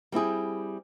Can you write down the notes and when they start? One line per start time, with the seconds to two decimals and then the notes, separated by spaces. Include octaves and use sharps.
0.12 G3 C4 E4 G#4